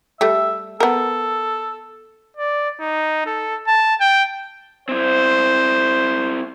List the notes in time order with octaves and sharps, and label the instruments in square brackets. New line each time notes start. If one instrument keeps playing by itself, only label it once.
[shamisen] G3 A3 [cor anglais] E5
[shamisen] B3 A#4 [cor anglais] A4
[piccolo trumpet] D5
D#4
A4
A5
G5
[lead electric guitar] C4 E4 [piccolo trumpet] C5